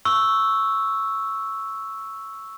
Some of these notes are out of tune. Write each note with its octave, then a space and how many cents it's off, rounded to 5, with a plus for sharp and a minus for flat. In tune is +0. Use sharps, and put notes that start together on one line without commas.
C#6 +0 E6 +0